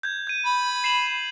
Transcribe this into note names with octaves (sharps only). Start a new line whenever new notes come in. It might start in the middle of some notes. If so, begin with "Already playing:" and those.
G6 G#6
G6 D#7
B5
C7 E7 F#7